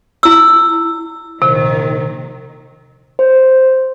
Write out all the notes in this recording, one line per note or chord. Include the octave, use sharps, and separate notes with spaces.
E4 E6
A#1 C3 D#3
C5